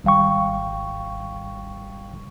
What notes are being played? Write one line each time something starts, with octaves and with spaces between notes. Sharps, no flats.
G#1 G3 F5 G5 C#6